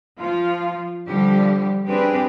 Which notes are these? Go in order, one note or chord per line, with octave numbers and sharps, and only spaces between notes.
F3 F4
D3 F3 G3 G4
C4 D4 G4 G#4 B4